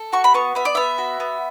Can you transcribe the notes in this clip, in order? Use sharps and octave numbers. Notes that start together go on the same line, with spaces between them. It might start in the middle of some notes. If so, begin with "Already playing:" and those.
Already playing: A4
F#4 C#6
B5
B3 C#6
B3 E5
D5
B3 E5
F#4
B3